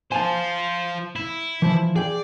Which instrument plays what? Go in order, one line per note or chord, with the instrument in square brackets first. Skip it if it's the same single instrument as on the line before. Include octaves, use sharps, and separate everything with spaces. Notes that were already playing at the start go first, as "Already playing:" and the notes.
[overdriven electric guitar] F4 C5 [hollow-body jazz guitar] G#5 A5
[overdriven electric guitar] E4
[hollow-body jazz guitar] E3 F3
[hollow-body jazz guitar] G#4 G5 [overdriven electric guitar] D5